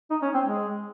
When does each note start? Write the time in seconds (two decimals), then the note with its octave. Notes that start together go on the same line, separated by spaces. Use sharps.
0.10 D#4
0.22 C#4
0.34 C4
0.45 G#3